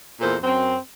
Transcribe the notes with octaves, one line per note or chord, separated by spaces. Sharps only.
E2 A#2 A4 A#4 C5
F#2 C4